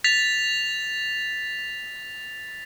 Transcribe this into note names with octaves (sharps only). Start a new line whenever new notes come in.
A6 B6 F7